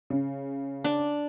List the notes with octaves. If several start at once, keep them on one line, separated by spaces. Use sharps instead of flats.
C#3
D4